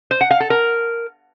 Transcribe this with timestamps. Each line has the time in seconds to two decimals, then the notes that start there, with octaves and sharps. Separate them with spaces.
0.11 C5
0.21 F#5
0.31 F5
0.40 A4
0.50 A#4